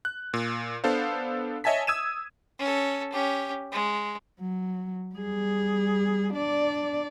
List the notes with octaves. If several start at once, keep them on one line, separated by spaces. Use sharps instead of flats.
F#6
A#2
B3 D4 A4 C5 F5
C#5 D#5 E5 G#5 A5 B6
D#6 E6 G#6 D#7 E7
C#4 A4
C#4 G4
G#3
F#3
G3 G#4
D4 D5